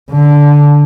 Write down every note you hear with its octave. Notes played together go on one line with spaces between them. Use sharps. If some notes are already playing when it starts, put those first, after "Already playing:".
D3